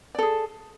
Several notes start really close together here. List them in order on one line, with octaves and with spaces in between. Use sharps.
D5 A4 G#4